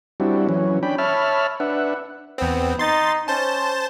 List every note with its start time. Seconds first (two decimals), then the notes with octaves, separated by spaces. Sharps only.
0.20 G3 C4 D4 E4 F#4
0.49 E3 F#3 C#4
0.83 C#4 D4 G5 B5
0.98 C#5 E5 A5 B5 F6
1.60 D4 B4 E5 F#5
2.38 E2 B3 C4
2.79 D#4 C6 A6
3.28 C#4 C5 A5